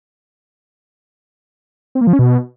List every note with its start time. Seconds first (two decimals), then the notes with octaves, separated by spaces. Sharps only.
1.95 C4
2.01 A#3
2.07 F3
2.13 C#4
2.19 B2